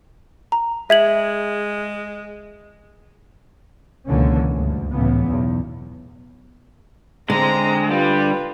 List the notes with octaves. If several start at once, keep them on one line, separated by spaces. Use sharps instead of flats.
A#5
G#3 E5 G#6 F#7
C#2 B2 D3 E3 A#3 C#4
D2 G2
C#2 A2 C#3 E3 B3
B1 E2
D3 G#3 C4 A#5
G3 F4 B4